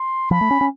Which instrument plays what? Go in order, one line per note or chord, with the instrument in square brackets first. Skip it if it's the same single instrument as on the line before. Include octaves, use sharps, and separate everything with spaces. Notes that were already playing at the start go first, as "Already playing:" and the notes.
Already playing: [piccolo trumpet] C6
[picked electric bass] F3 [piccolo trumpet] B5
[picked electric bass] A3
C#4
C#4